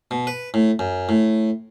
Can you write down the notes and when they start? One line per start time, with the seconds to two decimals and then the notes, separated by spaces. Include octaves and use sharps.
0.11 B2
0.27 B4
0.54 A2
0.79 F#2
1.09 A2